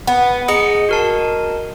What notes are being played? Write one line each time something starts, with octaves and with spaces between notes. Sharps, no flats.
B3
D#4 G#4 D#5 C#7
F#4 A#4 A5